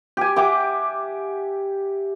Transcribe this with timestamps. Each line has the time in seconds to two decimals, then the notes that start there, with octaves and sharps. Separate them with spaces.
0.17 G4 G#5
0.36 G4 E5 F#5 D6